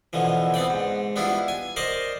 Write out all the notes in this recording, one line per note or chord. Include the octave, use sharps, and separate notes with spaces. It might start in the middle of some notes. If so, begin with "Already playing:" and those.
B2 D3 E3 F3
B3 C4 D5 G5
G#2
G3 B3 D4 E4 F4
G#5
A#4 C5 D5 D#5 A5 C6